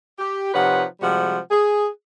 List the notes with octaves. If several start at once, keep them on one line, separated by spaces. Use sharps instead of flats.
G4
C3 F3 D#4 B4 C#5 F#5
C3 F3 G3 G#3 F#4 F#5
G#4